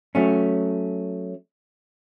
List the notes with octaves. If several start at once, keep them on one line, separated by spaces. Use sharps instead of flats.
F#3 A3 C#4